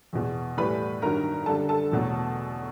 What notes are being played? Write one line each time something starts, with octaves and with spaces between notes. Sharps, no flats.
E2 B2 G#3
A2 E3 G3 B4 B5
G2 D#3 F#3 A#4 A#5
F#2 D3 G3 A4 A5
A4 A5
E2 B2 F#3 A3